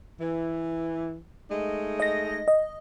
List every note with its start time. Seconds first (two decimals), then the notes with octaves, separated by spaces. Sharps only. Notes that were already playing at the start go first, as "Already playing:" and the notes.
0.20 E3
1.50 G#3 A3 D#4
2.00 D#5 A#6
2.48 D#5